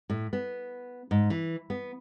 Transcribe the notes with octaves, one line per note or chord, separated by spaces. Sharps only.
A2
B3
G#2
E3
B3